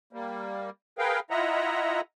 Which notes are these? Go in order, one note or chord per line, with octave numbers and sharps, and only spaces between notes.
G3 A#3
G#4 A#4 B4 F5 G5
E4 F4 D#5 E5 F#5 A#5